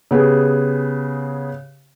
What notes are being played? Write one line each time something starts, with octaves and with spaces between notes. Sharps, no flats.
C#3 B3 G4 G#4